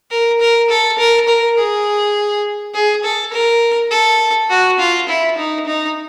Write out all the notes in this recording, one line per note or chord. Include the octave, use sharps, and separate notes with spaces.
A#4
A#4
A4
A#4
A#4
G#4
G#4
A4
A#4
A4
F#4
F4
E4
D#4
D#4